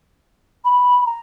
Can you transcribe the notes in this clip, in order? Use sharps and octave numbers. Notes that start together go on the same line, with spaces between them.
B5
A#5